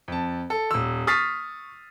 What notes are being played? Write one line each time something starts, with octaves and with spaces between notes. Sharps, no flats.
F2 A5
A4
D#1 E6
C#6 D#6 F6 A6 B6 C7